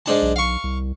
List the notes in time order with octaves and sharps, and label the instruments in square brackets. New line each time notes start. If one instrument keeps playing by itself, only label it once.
[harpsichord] G#2 D4 A5
[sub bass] B1
[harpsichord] F5 C#6
[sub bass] C2